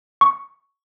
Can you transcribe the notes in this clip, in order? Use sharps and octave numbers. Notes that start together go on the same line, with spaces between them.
C#6